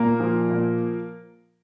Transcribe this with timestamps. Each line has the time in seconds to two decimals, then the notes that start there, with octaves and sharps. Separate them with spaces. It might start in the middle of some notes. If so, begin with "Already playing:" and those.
Already playing: A#2 A#3 A#4
0.20 F3
0.51 A#2